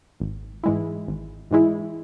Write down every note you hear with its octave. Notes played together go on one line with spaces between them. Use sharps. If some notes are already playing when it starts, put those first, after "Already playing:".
G#1
G#2 E3 G#3 E4
G#1
G#2 E3 G#3 E4